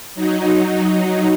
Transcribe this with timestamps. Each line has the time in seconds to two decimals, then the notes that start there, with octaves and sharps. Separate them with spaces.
0.15 F#3 D#4